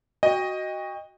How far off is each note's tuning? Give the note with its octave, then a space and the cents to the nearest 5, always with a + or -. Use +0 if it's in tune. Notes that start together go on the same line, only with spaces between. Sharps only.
F#4 +5 D#5 +0 G5 +30